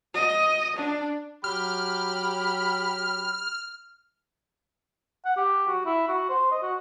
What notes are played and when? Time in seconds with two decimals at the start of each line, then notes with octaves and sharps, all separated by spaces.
0.15 D#5
0.76 D4
1.44 F#3 G4 B5 F6
5.25 F#5
5.37 G4
5.68 F#4
5.86 E4
6.08 F#4
6.29 C5
6.52 D#5
6.63 F#4